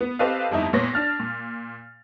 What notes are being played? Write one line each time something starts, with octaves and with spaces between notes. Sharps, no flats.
B3
C4 G4 A4 B4 D#5 F5
G1 F2 D#4 E4
A#2 B3 C#5 A#6
D4 F6 A6
A#2